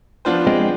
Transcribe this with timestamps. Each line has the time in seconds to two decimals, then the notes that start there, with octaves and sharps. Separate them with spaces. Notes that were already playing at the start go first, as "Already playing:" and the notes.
0.25 F3 B3 D4 F4 C5
0.47 G#3 C4